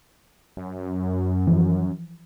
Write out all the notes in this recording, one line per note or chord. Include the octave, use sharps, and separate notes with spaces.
F#2
E3 F3